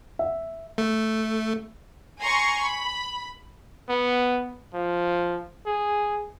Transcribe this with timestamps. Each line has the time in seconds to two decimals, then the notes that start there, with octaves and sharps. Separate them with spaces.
0.19 E5
0.78 A3
2.20 G#5 A#5 C6 C#6
2.62 B5
3.89 B3
4.74 F3
5.66 G#4